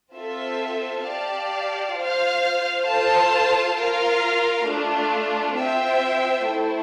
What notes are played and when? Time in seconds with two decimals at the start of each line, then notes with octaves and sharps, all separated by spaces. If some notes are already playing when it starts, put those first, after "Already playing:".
0.14 C4 F4 A4 E5
1.04 G4 D5 F5 A5
1.96 F4 C5 F5
2.87 F4 A4 C5 F5 A5
3.77 F4 A#4 F5
4.68 A3 D4 F4
5.59 C4 F4 C5 E5 G5
6.50 A3 E4 A4 C5